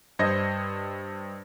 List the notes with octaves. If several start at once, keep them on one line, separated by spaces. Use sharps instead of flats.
G2 C5 D#5 G#6 A#6 C#7